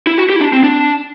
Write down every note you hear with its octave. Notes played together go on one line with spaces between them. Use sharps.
E4
F#4
G4
E4
D4
C4
D4